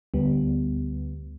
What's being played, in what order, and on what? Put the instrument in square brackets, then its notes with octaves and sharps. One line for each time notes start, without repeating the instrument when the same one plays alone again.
[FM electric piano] D2 G3 B3